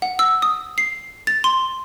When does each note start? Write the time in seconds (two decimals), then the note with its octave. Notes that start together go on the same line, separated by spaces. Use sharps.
0.02 F#5
0.19 E6
0.42 D#6
0.78 C7
1.27 A6
1.44 C6